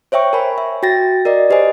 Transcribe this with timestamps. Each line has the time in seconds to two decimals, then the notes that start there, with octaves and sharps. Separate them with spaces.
0.12 C5 C#5 E5 G5 C#6
0.33 A#4 G#5 B5
0.58 E5
0.83 F#4 G5 A6 A#6
1.25 A#4 D5 D#5
1.50 G4 B4 C5 D#5 G#5